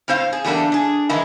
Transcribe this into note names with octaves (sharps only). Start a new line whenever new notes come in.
A2 C4 C5 F5
G#4
E2 G3 A3 A#3 D4
D4 G#4
D#3 E3 G#3 D#4 E4